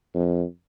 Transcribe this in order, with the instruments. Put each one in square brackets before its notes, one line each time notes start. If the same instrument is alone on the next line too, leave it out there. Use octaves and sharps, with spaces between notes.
[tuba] F2